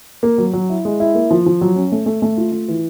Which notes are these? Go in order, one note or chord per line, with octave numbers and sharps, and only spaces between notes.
A#3
F#3
F#3
E4
G#3
E4
A#3
F3
F3
F#3
C#4
A3
A3
A3
F4
A3
E3